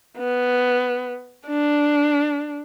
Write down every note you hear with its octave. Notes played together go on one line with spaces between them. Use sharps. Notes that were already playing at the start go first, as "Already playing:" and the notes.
B3
D4